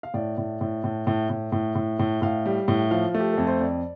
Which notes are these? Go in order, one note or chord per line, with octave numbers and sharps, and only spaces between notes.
F5
A2 D5
A2
A2
A2
A2
A2
A2
A2
A2
A2 F5
G3
A2
F3 F5
A3
G4
F2 A4
C5
F2 D5